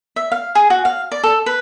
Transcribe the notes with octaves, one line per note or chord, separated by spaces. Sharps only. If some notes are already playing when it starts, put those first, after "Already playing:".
E5
F5
G#4
F#4
F5
D5
A4
B4